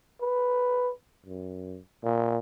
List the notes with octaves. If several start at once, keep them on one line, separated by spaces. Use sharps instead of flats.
B4
F#2
A#2